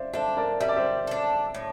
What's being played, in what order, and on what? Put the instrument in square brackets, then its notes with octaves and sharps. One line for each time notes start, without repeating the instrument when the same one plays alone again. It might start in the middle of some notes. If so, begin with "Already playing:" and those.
Already playing: [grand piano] C5 D5 E5 F5
[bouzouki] D4 A4 [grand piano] C5 E5
[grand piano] A#4 D5
[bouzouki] G3 [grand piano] E5
[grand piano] D5
C5 E5
[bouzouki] D4 A4
A2